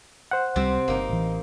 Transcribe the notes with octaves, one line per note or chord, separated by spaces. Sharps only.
C5 F#5
C#2 C3 G3 C4
G1 A#3 D#4
A1 E3